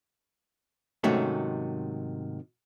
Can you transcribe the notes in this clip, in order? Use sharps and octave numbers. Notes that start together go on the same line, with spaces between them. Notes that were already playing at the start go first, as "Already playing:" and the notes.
G#2 C3 D#3 F#3 A3 C#4